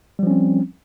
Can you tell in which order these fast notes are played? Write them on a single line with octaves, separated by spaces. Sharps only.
G3 F3 C#4 C4